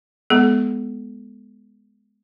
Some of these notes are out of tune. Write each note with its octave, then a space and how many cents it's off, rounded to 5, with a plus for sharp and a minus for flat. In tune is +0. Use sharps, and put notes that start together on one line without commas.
G#3 +0 B3 +0 A4 -20